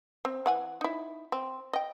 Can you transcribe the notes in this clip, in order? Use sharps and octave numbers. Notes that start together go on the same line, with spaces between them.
C4
E3 F#5 G#5
D#4 E4
C4
D#5 G5